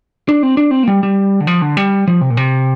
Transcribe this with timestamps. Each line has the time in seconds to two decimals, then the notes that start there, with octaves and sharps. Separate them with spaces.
0.29 D4
0.43 C4
0.57 D4
0.71 C4
0.83 A#3
0.88 G3
1.03 G3
1.40 D3
1.47 F3
1.62 D3
1.77 G3
2.08 F3
2.21 C3
2.30 A#2
2.37 C3